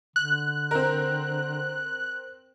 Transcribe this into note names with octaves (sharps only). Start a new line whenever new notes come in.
D3 F#6
C4 A#4